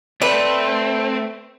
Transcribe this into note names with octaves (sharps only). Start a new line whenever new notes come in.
A3 C4 A4 B4 D5